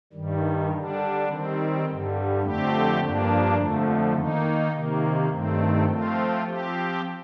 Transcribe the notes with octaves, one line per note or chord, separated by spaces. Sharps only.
G2 D#3 G3
D3 G3 D4
D#3 G3 C4
G2 D3 G3
F2 D3 A3 C4 G4
G2 F3 A#3 D4
F2 D3 F3 A3
D#3 A#3 D#4
C3 D#3 A#3
G2 D#3 A3 C4
F3 A3 C4 F4
F3 C4 G4